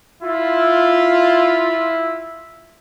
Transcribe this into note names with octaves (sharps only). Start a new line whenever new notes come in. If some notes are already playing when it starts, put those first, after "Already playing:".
E4 F4